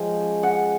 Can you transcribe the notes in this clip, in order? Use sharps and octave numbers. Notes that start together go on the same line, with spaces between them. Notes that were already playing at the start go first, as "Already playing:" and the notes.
Already playing: F3 G#3 C#4 G5
F#5